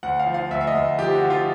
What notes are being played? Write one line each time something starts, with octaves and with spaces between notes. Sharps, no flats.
D2 F#5
F5
F3
F5
D2 E5
E5
D#5
D2
F3 G4
F#4
F3
F4